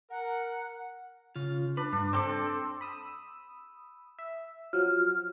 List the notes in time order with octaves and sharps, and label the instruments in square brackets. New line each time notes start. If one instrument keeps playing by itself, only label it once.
[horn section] A#4 [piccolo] F#5
[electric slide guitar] C#3 F4
[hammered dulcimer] D4 [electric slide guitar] B4
[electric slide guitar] G2 [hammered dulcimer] D4
[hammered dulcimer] C4 [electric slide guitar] D4 G4 A4
[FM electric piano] B5 D#6 E6
E5
[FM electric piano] F3 F#3 [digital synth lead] F6